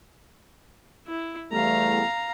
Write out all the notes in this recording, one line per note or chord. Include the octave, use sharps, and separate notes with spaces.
E4
E2 G3 A3 F5 A#5